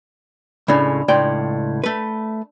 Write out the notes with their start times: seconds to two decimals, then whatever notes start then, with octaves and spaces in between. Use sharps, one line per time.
0.68 C#2 A2 C#3 D4 D5 B5
1.08 C#2 A2 D5 G5 C6
1.84 A3 B4